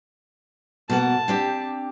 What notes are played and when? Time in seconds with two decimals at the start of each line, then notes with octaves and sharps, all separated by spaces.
0.90 B2 A#3 F#5 A5
1.28 C4 D4 G4